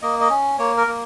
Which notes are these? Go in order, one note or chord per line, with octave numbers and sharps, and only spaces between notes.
A#3 D#5
D#5
C#4
A#3 C#5
A#4
A#3